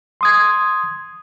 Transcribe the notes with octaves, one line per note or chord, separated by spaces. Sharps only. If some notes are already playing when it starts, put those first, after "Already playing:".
C6 D#6 G#6